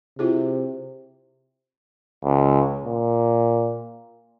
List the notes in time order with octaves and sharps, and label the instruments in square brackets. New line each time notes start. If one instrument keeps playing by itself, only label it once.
[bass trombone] C3 [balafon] E4 F4 G#4
[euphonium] C#2
A#2